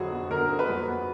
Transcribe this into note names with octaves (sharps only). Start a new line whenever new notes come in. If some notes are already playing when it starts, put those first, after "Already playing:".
Already playing: F2 D3 F#3 F#4 G#4
B3
D3 A#4
F2
B4
F#3
B3